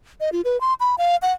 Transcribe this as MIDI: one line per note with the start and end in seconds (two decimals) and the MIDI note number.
0.20 0.30 75
0.32 0.41 65
0.45 0.60 71
0.61 0.74 84
0.80 0.95 83
0.98 1.16 77
1.22 1.33 78